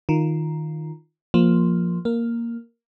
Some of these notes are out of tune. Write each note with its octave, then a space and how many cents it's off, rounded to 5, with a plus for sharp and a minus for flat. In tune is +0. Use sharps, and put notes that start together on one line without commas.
D#3 +0 F4 +0
F3 +0 A#3 +0
A#3 +0 A#4 -5